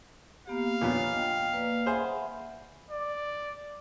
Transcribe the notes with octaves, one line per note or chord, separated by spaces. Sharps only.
A#3 B3 G4 F5
A#2 F3 B3 D4 C#5
D#5 G5
A#3 B4 D5
G#4 C5 E5 F#5 B5
D5